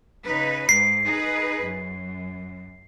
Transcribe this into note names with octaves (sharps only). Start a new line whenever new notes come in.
C#3 D#4 B4
G#2 C7
D#4 G#4 B4
F#2